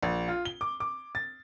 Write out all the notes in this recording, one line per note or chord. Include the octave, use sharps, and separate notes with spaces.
A#1
F4
G7
D6
D6
A6